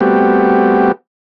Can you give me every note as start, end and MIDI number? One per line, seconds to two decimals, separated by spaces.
0.01 0.92 55
0.01 0.92 57
0.01 0.92 59
0.01 0.92 60
0.01 0.92 66
0.01 0.92 67